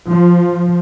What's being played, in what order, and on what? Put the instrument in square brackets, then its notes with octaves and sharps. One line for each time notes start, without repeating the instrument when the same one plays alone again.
[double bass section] F3